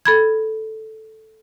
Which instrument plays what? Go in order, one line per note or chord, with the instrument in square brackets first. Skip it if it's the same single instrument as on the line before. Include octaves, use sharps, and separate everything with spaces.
[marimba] A4 B5 G#6